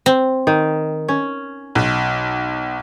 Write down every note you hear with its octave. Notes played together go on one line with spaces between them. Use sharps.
C4
D#3
C#4
B1